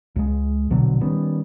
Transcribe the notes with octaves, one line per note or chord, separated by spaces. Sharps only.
C#2 G#3
A#1 B2 D3 F#3
D#3 G3 B3 C#4